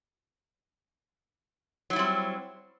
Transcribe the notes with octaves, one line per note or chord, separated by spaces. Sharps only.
F#3 G3 C4 E4